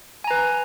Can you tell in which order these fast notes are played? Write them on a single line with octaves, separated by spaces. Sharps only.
G#5 A#5 B4